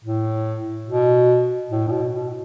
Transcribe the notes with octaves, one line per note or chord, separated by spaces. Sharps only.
A2
B2
A2
A2
B2
B2